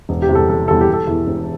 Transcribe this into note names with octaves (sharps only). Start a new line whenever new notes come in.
E1
G4
E2 C3 G3
A4
E1 A4
E2 C3 G3 A4
G4
E1
A4
E2 E3
E1